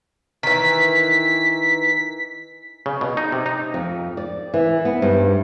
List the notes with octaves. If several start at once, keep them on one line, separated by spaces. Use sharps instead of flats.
D#3 E3 B6
C#3
B2
D#4
C3
D#4
F2
D5
E3
B3
G2